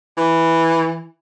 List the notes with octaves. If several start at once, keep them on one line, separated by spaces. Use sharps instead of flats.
E3